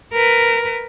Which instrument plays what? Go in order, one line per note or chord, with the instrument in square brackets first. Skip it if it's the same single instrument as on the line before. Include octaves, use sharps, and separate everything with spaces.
[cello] A#4 B4